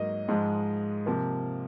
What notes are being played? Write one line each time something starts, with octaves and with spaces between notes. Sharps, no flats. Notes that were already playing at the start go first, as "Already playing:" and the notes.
Already playing: G#2 F#3 A#3 D#5
G#2 F3 G#3
C3 F3 A#3